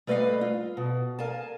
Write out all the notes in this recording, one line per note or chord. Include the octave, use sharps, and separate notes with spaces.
G3 A3 B4 D5 D#5 F5
F4
B2
A#4 F5 G#5 A5